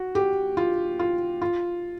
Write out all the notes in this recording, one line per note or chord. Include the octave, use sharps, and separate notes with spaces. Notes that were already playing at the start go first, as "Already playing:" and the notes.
Already playing: F#4
G4
F4
F4
F4